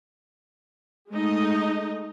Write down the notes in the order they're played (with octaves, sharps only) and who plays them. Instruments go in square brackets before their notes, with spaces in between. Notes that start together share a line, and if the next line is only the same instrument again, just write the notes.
[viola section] G#3 A3 D#4 D#5